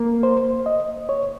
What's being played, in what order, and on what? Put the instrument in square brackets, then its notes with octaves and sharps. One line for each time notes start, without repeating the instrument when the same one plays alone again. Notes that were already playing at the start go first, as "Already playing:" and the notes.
Already playing: [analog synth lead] A#3
[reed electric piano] C5
D#5
C#5